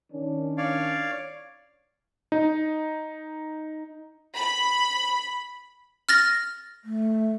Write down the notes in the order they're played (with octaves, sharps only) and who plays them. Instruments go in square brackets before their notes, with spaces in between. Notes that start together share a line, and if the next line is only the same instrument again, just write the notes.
[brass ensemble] D#3 C#4 D4
[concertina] C#5 D5 F5
[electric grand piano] D#4
[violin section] B5
[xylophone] F6 A6 A#6
[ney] A3